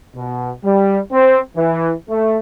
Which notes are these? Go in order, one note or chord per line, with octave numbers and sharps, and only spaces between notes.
B2
G3
C4
E3
A3